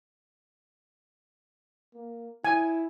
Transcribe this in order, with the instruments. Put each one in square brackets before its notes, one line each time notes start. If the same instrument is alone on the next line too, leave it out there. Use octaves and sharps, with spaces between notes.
[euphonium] A#3
[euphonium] E4 [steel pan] G#5